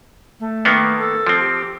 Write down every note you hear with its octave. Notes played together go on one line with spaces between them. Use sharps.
A3
D#3 A#3 B3
A4
F3 C4
G4